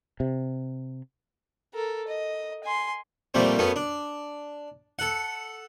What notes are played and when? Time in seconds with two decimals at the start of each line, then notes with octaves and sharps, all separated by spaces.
0.20 C3
1.74 A4 A#4
2.08 D#5
2.64 G#5 C6
3.34 A#2 F3 G3 A3 C4
3.58 F#2 A3 B3 C#4
3.76 D4
4.99 A4 F#5